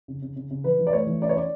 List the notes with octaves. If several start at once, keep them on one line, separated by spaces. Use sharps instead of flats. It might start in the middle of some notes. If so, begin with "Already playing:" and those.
C#3
C#3
C#3
C#3
E3 B4
E3
D5
A3 C#5
E3
C#4 D5
C#5
C#4 D5